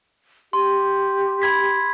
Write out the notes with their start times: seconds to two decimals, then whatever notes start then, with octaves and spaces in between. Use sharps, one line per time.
0.53 G4 C6
1.42 B5 G#6 B6